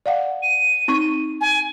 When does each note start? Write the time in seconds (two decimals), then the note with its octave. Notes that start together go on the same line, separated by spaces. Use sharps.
0.06 D5 F5 F#5
0.42 D#7
0.88 C4 D#4 C#6
1.41 G#5